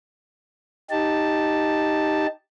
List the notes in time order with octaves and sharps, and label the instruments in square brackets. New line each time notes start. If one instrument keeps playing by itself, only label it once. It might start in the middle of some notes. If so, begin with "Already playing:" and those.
[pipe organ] D#4 G4 A5